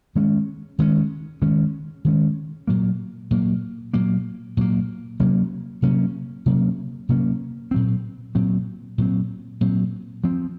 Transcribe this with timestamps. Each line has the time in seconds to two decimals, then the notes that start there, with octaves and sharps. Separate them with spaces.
0.15 D#3 G#3 C#4
0.79 D#3 G#3 C#4
1.42 D#3 G#3 C#4
2.05 D#3 G#3 C#4
2.67 A#2 F#3 A#3
3.31 A#2 F#3 A#3
3.94 A#2 F#3 A#3
4.57 A#2 F#3 A#3
5.20 C3 F#3 A#3 C#4
5.82 C3 F#3 A#3 C#4
6.46 C3 F#3 A#3 C#4
7.09 C3 F#3 A#3 C#4
7.71 A#2 F#3 C4
8.35 A#2 F#3 C4
8.98 A#2 F#3 C4
9.61 A#2 F#3 C4
10.24 F3 C4